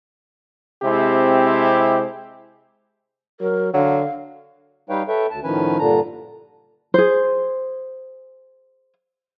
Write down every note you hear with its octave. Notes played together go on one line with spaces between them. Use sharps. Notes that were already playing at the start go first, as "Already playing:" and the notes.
C3 G#3 C4 E4 G4
F#3 A#4
D3 F#3 F5
G3 D#4 B4 C#5 F5 G5
A4 B4 C#5 E5 G5
D2 A5
A2 D#3 F3 C#4 B4 G#5
G2 A#2 D3 D4 A#5
G#4 C5